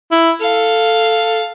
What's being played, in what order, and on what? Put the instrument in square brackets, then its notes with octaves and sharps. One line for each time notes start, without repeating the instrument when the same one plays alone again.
[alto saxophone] E4
[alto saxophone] A4 [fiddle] F5